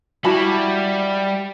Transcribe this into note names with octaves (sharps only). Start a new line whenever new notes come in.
G3 E4 F#4 A5 B5